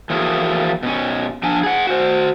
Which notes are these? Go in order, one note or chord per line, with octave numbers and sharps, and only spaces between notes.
E3 F3 A#3 F#4 G#4 A4
B2 C#4
F3 D4 G#5
G#4 F#5
F#4 C5